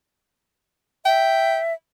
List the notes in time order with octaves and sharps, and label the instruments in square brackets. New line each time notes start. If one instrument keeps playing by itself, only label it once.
[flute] E5 [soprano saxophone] G5